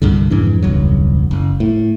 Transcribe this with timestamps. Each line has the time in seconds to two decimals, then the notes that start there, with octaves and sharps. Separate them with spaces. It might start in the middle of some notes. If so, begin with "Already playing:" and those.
0.02 C2 G2 D3
0.31 F2 G#2 E3 D4
0.62 E1 C#2 G2 F#3
1.31 F#1
1.60 A2